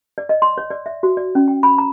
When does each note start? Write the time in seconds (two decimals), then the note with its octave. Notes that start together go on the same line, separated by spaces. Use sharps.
0.18 D5
0.29 D#5
0.42 C6
0.58 C#5
0.70 D5
0.86 E5
1.03 F#4
1.17 D5
1.35 C#4
1.48 G5
1.63 B5
1.78 A#5